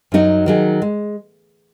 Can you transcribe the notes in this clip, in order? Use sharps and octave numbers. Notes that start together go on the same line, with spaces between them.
F#2 F#3 D#4 F#4
D#3 F#3 D#4 G#4
G#3